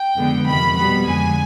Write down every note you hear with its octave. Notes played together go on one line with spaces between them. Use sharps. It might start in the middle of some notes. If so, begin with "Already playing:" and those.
Already playing: G5
F2 D3 G#3 B3
F2 C3 D#3 B5
B2 G3 B3 B5
F2 D3 G#3 G#5